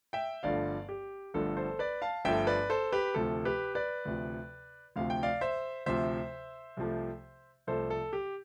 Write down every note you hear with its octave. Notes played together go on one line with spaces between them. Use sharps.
E5 G5
G1 G2 D3 F3 A3 D5 F5
G4
G1 G2 D3 F3 A3 A4
A4 C5
B4 D5
F5 A5
G1 G2 D3 F3 A3 E5 G5
B4 D5
A4 C5
G4 B4
D2 C3 F3 A4
G4 B4
B4 D5
D2 C3 F3
D2 C3 F3 F5
G5
D5 F5
C5 E5
D2 C3 F3 C5 E5
C2 C3 F3 A3
C2 C3 F3 A3 A4 C5
A4
G4